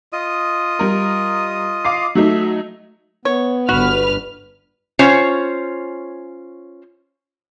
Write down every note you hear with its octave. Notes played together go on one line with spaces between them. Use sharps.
F4 D#5 D#6
G3 A#4
F5 D6 C7
F#3 A3 D#4 E5
B3 C#5
G1 F#4 B4 F6
C#4 F4 C5 C#5